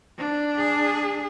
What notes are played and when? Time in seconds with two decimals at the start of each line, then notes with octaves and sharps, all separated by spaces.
0.18 D4
0.57 G#4